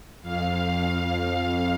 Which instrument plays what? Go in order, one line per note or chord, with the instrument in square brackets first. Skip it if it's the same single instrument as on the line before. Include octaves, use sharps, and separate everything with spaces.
[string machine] F2 F5